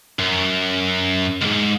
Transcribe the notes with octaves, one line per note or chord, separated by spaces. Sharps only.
F#2
C#2 G#2